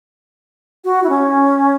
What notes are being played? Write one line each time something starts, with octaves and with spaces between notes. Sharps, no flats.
F#4
E4
C#4